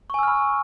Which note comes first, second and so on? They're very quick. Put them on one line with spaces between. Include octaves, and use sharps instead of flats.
C#6 G#5 E6 F6 B5